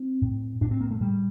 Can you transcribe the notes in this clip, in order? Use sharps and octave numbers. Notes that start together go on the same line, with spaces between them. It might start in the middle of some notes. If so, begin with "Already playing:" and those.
Already playing: C4
A2
A2 D4
C4
A#3
A3
A2 G3